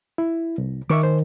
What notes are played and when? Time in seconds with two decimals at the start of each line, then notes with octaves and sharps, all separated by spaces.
0.18 E4
0.58 C2
0.90 D#3 E5 C#6 D6
1.03 C5